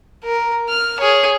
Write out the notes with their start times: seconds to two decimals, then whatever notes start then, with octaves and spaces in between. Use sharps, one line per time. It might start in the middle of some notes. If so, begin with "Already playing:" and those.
0.24 A#4
0.69 F6
1.00 G#4 C#5